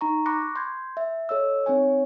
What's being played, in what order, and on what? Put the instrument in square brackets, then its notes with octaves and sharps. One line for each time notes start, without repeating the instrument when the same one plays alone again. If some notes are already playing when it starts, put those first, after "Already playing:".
[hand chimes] D#4 A#5 C#6
B5 C#6 D6 F#6 A#6 C#7
C6 G6 G#6
E5
A4 C#5 D#5 E6
C4 D#4 C#5 G#5